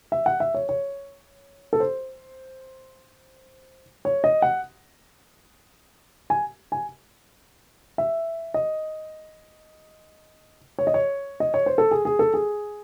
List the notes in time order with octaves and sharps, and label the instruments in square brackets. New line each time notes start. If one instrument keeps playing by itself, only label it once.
[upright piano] E5
F#5
E5
C#5
C#5
A4
C5
C#5
D#5
F#5
G#5
G#5
E5
D#5
C#5
D#5
C#5
D#5
C#5
C5
A4
G#4
G#4
A4
G#4